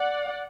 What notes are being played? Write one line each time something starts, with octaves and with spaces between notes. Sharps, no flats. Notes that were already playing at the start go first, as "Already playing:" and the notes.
Already playing: D5 F#5